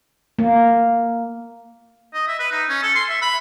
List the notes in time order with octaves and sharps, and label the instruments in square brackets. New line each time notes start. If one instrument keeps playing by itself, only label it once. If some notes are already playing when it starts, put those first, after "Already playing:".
[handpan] A#3
[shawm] D#5
E5
B4
D#4
C#4
A4
C6
E5
B5